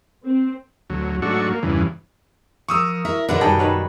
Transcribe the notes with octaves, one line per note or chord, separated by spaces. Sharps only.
C4
D2 F#3
G#2 F#3 A3 D4 F#4 C#6
A#3
E2 G2 C#3 E3
F3 A#4 C#6 D#6 E6
E4 A#4 E5
B2 D3 D4 A#4 B4 D5 F#5
F#2 D#3 G3 F#4 G#4 G5 A5
D#3 B4 C#5